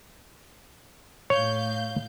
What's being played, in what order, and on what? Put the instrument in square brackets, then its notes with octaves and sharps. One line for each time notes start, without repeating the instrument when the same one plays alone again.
[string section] A2 F5 G6 [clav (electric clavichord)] C#5